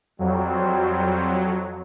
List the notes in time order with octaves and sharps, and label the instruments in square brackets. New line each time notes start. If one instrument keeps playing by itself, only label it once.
[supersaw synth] F2 F#3 [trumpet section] G3 C4 C5